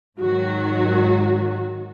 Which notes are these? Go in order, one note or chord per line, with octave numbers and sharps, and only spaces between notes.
G#2 D#3 F#3 F#4